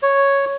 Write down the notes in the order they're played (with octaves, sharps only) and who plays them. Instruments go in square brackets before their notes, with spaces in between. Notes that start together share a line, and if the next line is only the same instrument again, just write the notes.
[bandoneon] C#5